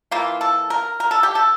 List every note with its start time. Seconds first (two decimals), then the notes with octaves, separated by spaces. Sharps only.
0.11 E3 A#3 F4
0.41 A4
0.70 A#4
1.00 A#4
1.11 A4
1.23 G4
1.35 A4